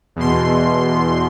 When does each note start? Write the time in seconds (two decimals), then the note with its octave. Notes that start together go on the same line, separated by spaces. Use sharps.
0.16 E2 B2 C6